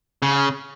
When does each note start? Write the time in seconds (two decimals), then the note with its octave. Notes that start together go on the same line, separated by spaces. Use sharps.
0.22 C#3